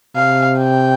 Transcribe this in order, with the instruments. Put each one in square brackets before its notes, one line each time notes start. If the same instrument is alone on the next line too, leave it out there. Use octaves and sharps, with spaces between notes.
[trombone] C3 [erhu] F5
[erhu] G5